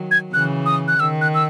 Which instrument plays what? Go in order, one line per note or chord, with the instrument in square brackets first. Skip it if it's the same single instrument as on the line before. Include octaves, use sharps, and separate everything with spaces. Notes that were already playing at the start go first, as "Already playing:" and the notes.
Already playing: [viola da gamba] D#3 F#3
[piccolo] G#6
[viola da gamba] C#3 E3 [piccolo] F#6
[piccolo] D#6
F#6
[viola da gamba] D#3 [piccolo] E6
[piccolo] F#6
E6